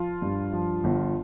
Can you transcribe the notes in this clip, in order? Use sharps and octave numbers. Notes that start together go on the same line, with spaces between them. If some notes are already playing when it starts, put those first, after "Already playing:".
Already playing: F3 F4
G2
F3
G1